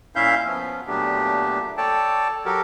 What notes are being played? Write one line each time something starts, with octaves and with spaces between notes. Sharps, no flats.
A#2 C#4 E4 E5 F5 G6
F3 B3 C#4
A#2 F#3 A3 B3 D4 G4
A4 C#5 D5 G5 A5
F#3 F#4 G4 A4 A#4